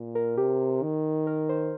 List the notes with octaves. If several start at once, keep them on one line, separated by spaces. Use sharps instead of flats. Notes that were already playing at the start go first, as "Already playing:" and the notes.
Already playing: A#2
A#4
C3 G4
D#3
A#4
C5